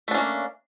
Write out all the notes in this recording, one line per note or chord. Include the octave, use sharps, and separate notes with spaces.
A3 A#3 C#4 D4